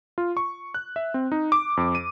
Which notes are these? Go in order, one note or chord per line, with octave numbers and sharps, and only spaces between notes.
F4
C#6
F#6
E5
C4
D#4
D6
F2
D#7